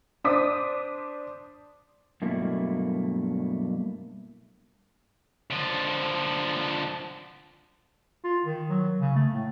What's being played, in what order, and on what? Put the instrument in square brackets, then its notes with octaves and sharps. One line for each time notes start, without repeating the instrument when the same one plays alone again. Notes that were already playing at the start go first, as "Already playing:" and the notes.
[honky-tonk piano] D4 C5 D6 D#6 B6
[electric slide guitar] G2 B2 F#3 A3 A#3 E4
[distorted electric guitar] D3 F3
[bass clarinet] F4
D#3
F#3
C#3
A3
A2